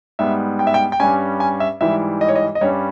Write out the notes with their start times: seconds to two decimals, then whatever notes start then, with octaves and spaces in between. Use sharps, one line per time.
0.19 G#2 G3 B3 E5
0.59 G5
0.67 E5
0.74 G5
0.92 G5
1.00 G2 G3 C#4 G#5
1.40 G#5
1.60 E5
1.81 G#2 E3 G3 E5
2.21 D#5
2.28 C#5
2.35 D#5
2.55 D#5
2.61 G2 G3 C#4 C#5